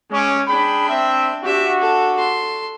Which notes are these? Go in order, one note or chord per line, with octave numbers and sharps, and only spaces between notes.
G#3 C#4 D6
D4 G#4 G5 B5
C4 E5
D4 F#4 G4 E5
A4
A4 C6